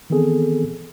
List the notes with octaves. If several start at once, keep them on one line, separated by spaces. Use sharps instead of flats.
D#3 E3 B3 C4 G#4 A4